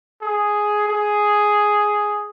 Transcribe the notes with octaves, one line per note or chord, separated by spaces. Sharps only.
G#4
G#4